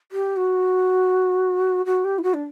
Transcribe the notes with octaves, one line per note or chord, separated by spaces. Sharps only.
G4
F#4
F#4
G4
E4
F#4
D4